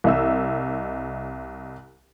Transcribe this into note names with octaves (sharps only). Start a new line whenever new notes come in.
C2 D#5 E5 E6